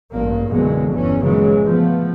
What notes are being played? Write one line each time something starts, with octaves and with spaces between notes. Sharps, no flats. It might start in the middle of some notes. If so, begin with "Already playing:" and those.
A1 G2 A#3
B1 F#2 B2 D3 E3 G#3
G1 E2 E3 C#4
A#2 C#3 E3 F#3 G#3
F3 A3 B3